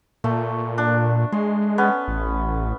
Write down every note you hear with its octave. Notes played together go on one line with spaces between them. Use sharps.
A#2 A3
D4
G#3 C6
B3 C#4
A1